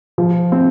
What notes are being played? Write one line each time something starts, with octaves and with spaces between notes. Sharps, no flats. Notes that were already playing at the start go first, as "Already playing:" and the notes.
F3
C4